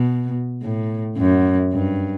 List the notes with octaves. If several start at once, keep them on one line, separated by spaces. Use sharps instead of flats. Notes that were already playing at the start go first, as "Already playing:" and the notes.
Already playing: B2
A2
F#2
G2